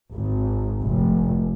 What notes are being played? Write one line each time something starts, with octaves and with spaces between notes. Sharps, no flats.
G#1
F1